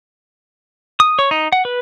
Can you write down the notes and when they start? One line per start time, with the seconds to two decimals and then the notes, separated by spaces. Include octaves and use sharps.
1.00 D#6
1.19 C#5
1.31 D#4
1.52 F#5
1.65 B4